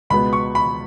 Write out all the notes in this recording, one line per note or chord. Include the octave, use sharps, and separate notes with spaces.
C#2 B2 G#3 B3 B5
C#6
B5